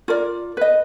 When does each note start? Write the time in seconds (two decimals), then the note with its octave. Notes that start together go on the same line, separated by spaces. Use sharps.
0.08 F4 A#4 D5
0.57 B4 D#5